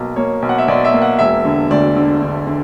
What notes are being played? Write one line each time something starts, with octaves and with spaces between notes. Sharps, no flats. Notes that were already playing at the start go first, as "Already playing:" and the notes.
Already playing: B1 B2 A#3
A#3 C#5
B1
F#5
E5
B1 D5
E5
A#3
F#5
E1 E5
D3
D2 D5
D3
D3
D3